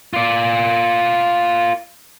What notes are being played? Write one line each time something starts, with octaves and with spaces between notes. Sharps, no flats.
F4 D5